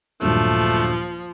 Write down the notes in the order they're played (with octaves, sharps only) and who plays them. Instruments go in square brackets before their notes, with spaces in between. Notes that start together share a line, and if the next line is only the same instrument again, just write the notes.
[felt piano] D#1 G2 F#3 [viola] F3 [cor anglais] A3